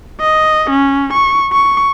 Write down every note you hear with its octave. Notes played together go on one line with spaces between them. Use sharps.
D#5
C#4
C#6
C#6